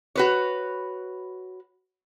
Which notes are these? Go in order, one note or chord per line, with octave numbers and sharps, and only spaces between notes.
F#4 B4 C#5